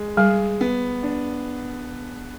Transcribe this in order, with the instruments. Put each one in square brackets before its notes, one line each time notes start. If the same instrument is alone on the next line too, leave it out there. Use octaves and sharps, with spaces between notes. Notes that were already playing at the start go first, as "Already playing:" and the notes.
Already playing: [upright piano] G#3
[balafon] G3 [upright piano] G#4
[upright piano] B3
D4